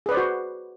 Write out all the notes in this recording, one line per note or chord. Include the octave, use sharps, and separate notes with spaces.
F#4 G#4 B4 C5 D5